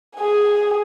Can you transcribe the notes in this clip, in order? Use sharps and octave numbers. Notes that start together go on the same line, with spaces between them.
G#4 G#5